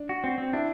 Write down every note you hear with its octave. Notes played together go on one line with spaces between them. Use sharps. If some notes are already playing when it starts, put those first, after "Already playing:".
Already playing: D4
F#4
C4
C4
D4 E4